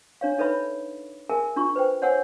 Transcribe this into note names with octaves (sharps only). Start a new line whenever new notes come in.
D4 C#5 F5
D#4 A4 B4 C#5 E5 B5
G#4 A#4 E5 G#5 A5
D4 F4 C#6
B4 C5 G5
C5 C#5 F#5 G#5 A5 E6